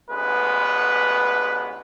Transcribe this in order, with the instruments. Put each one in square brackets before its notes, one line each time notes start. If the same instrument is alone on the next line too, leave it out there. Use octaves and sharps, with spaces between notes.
[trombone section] A1 D2 G#3 B3 B4